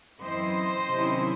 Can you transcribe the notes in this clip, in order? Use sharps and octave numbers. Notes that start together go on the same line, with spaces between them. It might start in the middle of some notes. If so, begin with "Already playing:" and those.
F#2 E3 C4 E4 C5 D#5
C3 D#3 F#3 C#4 E4